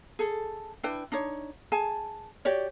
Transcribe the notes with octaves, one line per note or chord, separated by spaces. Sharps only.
G#4 A4
D4 E4 B4 G5
D4 D#4 C#5
G#4 G#5 A5
F#4 G4 C#5 D5